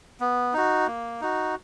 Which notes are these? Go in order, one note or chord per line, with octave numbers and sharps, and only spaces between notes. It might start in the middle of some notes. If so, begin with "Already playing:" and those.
B3
D#4 F#4
A#3
D#4 F#4